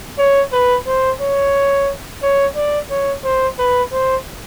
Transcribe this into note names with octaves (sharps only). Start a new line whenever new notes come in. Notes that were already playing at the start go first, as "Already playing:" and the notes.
C#5
B4
C5
C#5
C#5
D5
C#5
C5
B4
C5